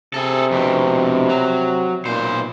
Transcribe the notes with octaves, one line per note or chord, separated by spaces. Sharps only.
C3 G#4 A4
F2 B2
F#3
B1 A#2 C5